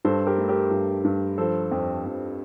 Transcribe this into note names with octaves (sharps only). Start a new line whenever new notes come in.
G2 A4 C5
G4 A#4
A3
G4 A#4
G2
G2
F3 A4 C5
F2
F2